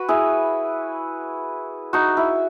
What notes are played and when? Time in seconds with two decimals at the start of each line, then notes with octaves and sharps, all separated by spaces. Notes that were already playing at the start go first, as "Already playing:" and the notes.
Already playing: F#4 B4
0.09 E4 G#4
1.93 D#4 F#4
2.17 E4